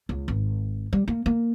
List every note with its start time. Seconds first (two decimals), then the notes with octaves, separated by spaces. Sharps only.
0.09 C#2
0.28 G#1
0.93 G3
1.08 A#3
1.26 A#3